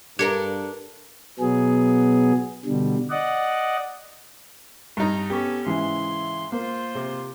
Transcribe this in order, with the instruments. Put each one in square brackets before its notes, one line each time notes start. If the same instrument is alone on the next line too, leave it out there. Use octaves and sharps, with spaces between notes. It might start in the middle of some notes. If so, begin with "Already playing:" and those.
[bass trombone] G2 [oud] D4 A4 A#4 [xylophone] G4 G#6 C#7
[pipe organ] B2 F#3 B3 G#4
B2 D3 G3
D5 D#5 F#5
[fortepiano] G2 D#4 [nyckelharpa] A#5
[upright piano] B3 [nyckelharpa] C#4 A4 [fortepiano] G4 C#6
[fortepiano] G#2 [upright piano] C#3 E3 E4 [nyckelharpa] C6
[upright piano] A#3 [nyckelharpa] F4 C5
[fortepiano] C3